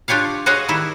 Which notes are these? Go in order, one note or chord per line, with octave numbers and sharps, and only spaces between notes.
D4 F4 G4 C#5 F5
F#4 G#4 C#5 D#5 F5 F#5
D#3 G3 E4